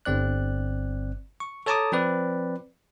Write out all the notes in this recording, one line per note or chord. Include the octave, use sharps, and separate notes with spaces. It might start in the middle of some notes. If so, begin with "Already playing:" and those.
G1 C4 D5 F#6
C#6
A4 C#5 A5 A#5 D6 D#6
F3 C4 B4 D5